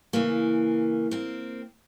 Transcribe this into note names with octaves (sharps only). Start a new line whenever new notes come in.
C#3 E3 A#3
A#3 C4